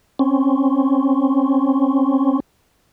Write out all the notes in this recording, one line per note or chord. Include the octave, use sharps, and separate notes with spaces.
C4 C#4